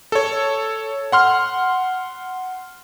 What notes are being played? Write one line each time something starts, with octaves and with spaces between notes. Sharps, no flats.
A4 C#5
F#5 C6 F6